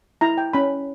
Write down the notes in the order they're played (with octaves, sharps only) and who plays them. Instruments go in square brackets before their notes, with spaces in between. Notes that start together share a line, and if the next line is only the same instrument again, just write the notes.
[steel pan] E4 A#5
G5
C#4 B5